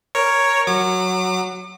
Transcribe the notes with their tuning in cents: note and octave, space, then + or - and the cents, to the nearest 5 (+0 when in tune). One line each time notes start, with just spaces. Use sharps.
A#4 +0 C#5 +0
F#3 +0 D6 +40